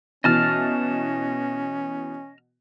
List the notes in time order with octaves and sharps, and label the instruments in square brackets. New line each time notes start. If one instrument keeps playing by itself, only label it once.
[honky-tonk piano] B2 E3 A6 [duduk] C#4 [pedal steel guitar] D#5 A5 F6